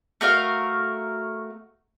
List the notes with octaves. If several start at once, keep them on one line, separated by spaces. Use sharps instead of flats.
A3 F#4 A#4 F5